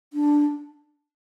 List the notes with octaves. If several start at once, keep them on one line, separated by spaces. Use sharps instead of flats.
D4